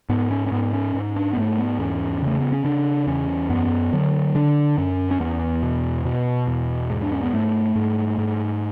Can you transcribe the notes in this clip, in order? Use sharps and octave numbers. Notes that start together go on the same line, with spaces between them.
G#2 B3
C#4
C#4
G#2 B3
C#4
G#2
D4
B3
G#2 A3
B3
E2 C#4
C#3 A3
B3
C#4
C#3 D4
E2 C#4
F#2 B3
D3 F#3
D3 D4
F#2 C#4
C#4
E2 B3
B2
B2
E2
G#2
D4
C#4
B3
G#2 A3
G#2
G#2